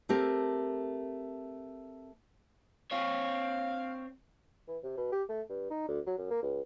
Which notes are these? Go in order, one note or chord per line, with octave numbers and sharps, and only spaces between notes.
A3 C4 G4 A#4
C4 C#5 F5
E3
C3
B2
G4
A3
G2
D#4
D2
F#3
F#2
A#3
C#2